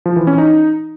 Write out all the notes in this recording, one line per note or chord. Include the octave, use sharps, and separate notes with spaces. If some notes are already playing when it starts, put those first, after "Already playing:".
F3
E3
C#4
D#4